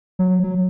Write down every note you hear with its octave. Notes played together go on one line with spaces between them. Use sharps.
F#3
F#3